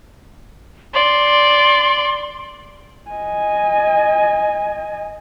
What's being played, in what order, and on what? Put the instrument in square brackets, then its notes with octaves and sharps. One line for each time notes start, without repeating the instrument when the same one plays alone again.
[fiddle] D5 [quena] C6
[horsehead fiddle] D#5 G#5